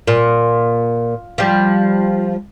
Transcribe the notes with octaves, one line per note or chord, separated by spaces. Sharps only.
A#2
F3 G3